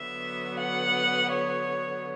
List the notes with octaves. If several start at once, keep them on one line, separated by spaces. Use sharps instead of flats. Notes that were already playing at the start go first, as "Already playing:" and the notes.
Already playing: D3 F#3 B3 E5
F#5
C#5